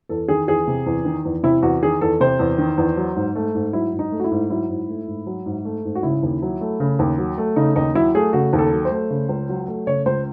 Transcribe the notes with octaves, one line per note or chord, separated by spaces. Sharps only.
E2 A4
D#3 G#4
E2 G#4
C3
E2
D#3
E2
C3 E4
E2 F#4
D#3 G#4
E2 A4
C3 C5
E2
D#3
E2
F#3
G#2
A3
G#2
F#3 E4
G#2
D#4
A3
F#4
E4
G#2
F#3 E4
G#2
A3
G#2
F#3
G#2
A3
G#2
F#4
C#3 E4
D#2
F#3
A3
C#3
D#2
F#3
A3
C#3 D#4
D#2 D#4
F#3 E4
A3 G#4
C#3 F#4
D#2
A4
F#3
C5
A3
C#3
C#2
F#3
A3
C#3 C#5
C#2 C5